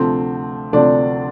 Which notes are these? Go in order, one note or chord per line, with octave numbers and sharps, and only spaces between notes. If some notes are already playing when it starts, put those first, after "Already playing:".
Already playing: D2 C3 F3 A3 C4
D2 C3 F3 A3 C4 D4 D5